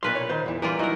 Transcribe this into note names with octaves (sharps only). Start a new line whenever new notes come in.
B1 E2 A#2 B4 F5 C6
C#5
D#3 C5
E2 E3
E3 G3 F4 A#4
F#3 D#4 E4 A#4